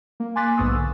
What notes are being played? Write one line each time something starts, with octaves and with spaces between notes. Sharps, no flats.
A#3
G#5 C6 D6 F#6 A6 B6
B1 G#2 B3 C#6 D#6 E6
D3